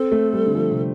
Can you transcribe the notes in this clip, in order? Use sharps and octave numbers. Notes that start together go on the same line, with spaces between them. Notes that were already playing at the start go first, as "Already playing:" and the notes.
Already playing: C4 A4
A3
G3
D3
F3
C3